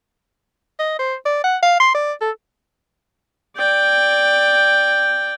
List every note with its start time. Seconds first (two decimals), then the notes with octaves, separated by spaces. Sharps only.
0.80 D#5
0.99 C5
1.26 D5
1.44 F#5
1.63 F5
1.80 C6
1.95 D5
2.21 A4
3.57 D5 G5